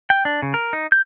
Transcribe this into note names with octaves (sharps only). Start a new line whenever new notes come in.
G5
D4
C#3
A#4
D#4
G6